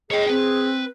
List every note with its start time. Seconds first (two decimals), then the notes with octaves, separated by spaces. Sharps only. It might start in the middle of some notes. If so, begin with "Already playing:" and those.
0.11 G#4 C#5 D#5 G5
0.29 C4 B4